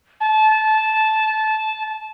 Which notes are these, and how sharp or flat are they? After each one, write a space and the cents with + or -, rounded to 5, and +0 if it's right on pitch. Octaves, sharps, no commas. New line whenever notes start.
A5 -20